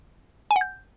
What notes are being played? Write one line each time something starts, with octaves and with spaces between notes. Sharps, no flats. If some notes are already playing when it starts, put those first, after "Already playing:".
G#5
F#5
G6